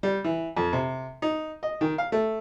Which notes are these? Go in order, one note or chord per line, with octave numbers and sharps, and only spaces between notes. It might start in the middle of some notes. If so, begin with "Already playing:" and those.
G3
E3
F2
C3
D#4
D#5
D#3
F5
A3